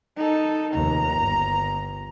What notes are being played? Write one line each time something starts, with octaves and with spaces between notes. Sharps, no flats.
D#4 A4
F1 D#2 A#5
G1